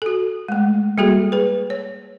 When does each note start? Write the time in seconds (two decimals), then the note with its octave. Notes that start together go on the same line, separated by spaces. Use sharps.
0.02 F#4 A4
0.48 G#3 A3
0.98 G3 A#3 F#4 G#4 A4
1.32 G#4 B4
1.70 C#5